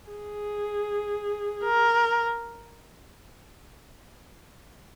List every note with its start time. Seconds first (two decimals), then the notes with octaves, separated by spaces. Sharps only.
0.10 G#4
1.65 A#4